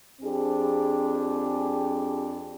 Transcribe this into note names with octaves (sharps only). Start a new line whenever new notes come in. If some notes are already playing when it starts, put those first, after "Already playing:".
F2 C4 D4 G4 G#4